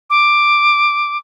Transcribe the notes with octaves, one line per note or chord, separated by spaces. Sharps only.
D6